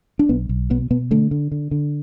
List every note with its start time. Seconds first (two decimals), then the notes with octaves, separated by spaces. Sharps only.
0.19 D4
0.29 B1 B3
0.49 B1
0.70 B2 B3
0.90 B2 B3
1.11 D3 A3
1.31 D3
1.52 D3
1.71 D3